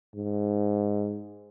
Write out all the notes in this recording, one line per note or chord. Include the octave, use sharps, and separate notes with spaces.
G#2